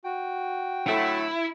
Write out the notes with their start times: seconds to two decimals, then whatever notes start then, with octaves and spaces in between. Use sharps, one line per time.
0.05 F#4 G5
0.87 D3 F#3 A3 E4